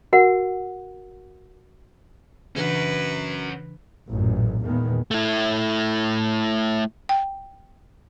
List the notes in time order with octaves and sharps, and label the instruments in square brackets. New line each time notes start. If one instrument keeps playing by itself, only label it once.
[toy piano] F#4 A#4 F#5
[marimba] C#3 E3 D4 [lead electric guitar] C#4 F#4 [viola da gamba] B4
[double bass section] A1 F#2 A#2
E2 A#2 D#3 G#3 B3
[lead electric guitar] A3 E4
[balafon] G5